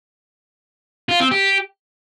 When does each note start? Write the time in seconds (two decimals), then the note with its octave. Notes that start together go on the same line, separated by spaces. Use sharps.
1.09 F4
1.20 C4
1.31 G4